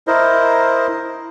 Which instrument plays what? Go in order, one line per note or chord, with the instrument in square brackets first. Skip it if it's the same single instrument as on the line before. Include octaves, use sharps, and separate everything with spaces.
[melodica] E4 A#4 C5 D#5